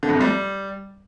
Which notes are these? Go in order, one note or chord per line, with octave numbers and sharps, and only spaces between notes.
D3
F2
C3
G3